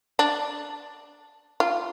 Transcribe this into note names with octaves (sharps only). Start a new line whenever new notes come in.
D4
F4